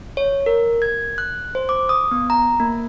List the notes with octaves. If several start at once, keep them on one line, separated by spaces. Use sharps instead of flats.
C#5
A#4
G#6
F#6
C5
D6
D#6
B3
A#5
A#3